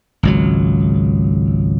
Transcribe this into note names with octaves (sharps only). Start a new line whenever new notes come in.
G#1 C#2 F#3